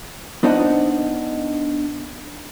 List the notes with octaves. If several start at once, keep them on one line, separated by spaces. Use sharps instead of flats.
B3 D4 D#4 C5 D#5 F#5